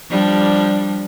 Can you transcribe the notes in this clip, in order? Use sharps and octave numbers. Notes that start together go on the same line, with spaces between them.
F3 G3 D4